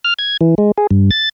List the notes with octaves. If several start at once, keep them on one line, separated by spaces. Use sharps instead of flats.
F6
G#6
E3
G#3
G#4
G2
A6